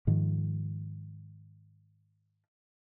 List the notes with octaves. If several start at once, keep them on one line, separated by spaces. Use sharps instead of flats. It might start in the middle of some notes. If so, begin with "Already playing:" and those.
G#2 D#3 F3